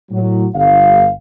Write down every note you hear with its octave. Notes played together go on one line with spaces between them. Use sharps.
A2 F#3
G1 F5